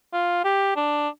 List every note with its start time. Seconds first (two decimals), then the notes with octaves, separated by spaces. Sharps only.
0.13 F4
0.45 G4
0.76 D4